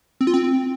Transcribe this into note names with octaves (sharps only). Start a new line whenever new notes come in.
C4
F4
C4